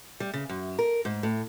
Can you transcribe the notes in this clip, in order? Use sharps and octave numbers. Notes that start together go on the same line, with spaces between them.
G3
C#3
F#2
A#4
G#2
A2